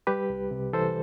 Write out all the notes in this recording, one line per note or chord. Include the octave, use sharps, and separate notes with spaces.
G3 G4 B4
C2
C3
E3 A4 C5